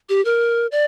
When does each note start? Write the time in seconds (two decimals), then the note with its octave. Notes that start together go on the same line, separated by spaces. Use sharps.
0.09 G4
0.25 A#4
0.72 D5